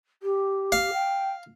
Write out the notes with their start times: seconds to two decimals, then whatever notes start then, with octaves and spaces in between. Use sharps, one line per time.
0.22 G4
0.72 F5
0.93 G5